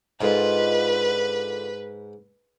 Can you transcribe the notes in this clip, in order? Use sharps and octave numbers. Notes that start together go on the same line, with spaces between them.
G#2 D3 F4 B4 D#5